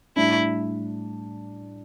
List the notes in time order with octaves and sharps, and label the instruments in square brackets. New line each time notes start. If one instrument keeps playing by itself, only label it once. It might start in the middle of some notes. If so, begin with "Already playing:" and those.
[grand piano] A2 G3 D4 [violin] E4